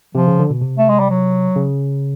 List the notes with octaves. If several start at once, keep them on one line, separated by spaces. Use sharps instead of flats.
C3 F3
C#3
D3
B2
C3
A3
G#3
G3
F#3
C#3